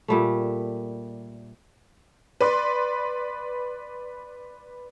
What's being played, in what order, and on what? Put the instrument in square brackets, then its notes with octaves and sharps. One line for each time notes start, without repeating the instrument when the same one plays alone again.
[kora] A#2 G3 A3
[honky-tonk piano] B4 D5 C6